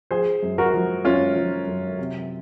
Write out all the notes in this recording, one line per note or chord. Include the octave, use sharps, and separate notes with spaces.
F3 G#4 C5
F#2
F#4 A#4
F3
F#2 C#4 F4
F3
F#2
C3